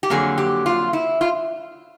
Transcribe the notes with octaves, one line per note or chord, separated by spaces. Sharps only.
G4
F2 D3 F#3 A#3 G#4
G4
F4
E4
F4